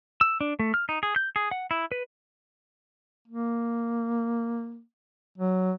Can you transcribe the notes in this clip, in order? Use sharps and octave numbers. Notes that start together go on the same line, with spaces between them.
E6
D4
A3
F6
D#4
G#4
G6
G#4
F#5
E4
B4
A#3
F#3